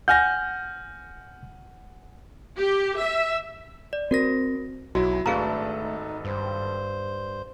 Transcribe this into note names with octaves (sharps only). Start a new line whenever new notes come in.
F#5 G#5 F6 G6 A#6
G4
E5
D5
C4 F#4 A#4 A#6
B1 F#3 E4 F#4 E5
G#1 A3 D4 G#4 A4 B4 F5 A#5
D#4
G2 C5